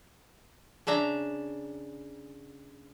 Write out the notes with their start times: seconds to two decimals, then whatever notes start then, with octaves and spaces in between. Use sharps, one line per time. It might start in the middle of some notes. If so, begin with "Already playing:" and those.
0.87 C#3 D4 E5 A#5